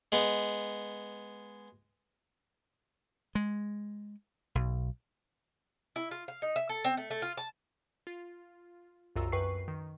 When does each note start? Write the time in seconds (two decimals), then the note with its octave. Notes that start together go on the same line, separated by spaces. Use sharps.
0.12 G#3 B3
3.35 G#3
4.55 B1
5.96 E4
6.11 F4
6.28 F5
6.42 D#4
6.56 E5
6.69 A4
6.85 C4
6.97 A3
7.10 A3
7.22 F4
7.37 A5
8.07 F4
9.16 C2 F#2 F4 F#4 A#5 E6
9.32 F#2 B4 G5 C#6 C7
9.68 D#3